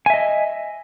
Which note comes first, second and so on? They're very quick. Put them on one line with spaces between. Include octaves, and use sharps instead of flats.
G#5 E5 D#5